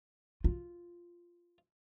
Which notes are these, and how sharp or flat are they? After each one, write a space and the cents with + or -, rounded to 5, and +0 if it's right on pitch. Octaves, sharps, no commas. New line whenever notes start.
F4 -5